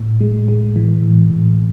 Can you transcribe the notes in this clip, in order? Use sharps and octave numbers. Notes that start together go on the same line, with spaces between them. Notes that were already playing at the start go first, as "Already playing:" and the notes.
Already playing: A2
G#3
G#3
E3
A2
A2